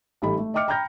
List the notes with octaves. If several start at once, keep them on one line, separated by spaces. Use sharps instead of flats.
A1 G3 D#4 A4 B5
A3
D#5 E5 G5 D6 F6 C#7
G5 A#5 B5 F6 G6 A#6